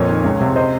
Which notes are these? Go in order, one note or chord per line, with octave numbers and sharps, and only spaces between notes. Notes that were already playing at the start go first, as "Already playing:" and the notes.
Already playing: F2 A#2 A#4 C#5
D#3
C#2
C3
C5 D#5